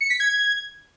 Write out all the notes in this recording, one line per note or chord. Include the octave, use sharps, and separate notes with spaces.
C#7
B6
G#6